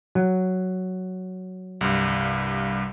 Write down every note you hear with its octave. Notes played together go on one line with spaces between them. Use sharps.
F#3
C2 G2